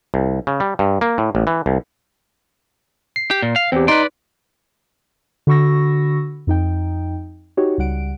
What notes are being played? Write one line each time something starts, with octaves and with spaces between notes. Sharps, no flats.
C2
C#3
G3
G2
A#3
A2
A1
E3
C2
C7
G4
A#2
F5
E2 C4 G4
D#4 B4 D5 C6
D3 F#4 B5 C#6 E6 A#6
F2 D#4 G5
D#4 F#4 G4 C#5
C#2 G3 F#5 D7